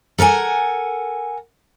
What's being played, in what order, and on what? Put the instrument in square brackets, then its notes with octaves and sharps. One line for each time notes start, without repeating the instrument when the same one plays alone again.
[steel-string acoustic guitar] A4 A#4 F#5 G#5